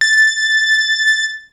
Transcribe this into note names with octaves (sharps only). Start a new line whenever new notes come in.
A6